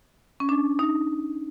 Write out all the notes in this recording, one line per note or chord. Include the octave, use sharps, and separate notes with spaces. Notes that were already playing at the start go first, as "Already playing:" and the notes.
C#4
D4
D#4